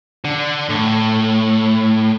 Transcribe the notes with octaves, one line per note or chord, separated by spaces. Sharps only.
D3
A2